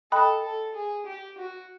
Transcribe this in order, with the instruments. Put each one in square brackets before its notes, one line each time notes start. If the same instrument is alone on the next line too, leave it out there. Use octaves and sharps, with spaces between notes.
[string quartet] A4 [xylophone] D#5 G5 B5 D#6 F#6
[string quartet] A4
G#4
G4
F#4